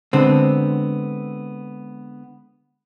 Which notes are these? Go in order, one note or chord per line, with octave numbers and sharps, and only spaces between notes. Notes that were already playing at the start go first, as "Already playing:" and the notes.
D3 G#3 B3 C4